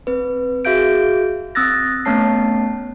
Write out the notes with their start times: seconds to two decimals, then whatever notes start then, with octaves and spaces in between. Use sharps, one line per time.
0.07 C4 B4
0.65 F#4 G#4 E5 F5 G6 D7
1.55 C4 D#6 E6 F#6 A6 A#6
2.05 A3 B3 C#4 C#5 A5 C7